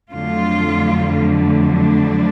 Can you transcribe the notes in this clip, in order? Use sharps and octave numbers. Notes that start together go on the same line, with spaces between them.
F2 D3 F#3 A3 F4
D4